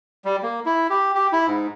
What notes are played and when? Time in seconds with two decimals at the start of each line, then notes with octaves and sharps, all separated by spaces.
0.25 G3
0.43 A#3
0.66 E4
0.90 G4
1.15 G4
1.33 E4
1.47 G#2